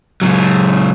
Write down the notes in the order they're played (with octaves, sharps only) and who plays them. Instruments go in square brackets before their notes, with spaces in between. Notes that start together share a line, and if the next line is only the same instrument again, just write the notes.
[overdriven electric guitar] C#2 F#3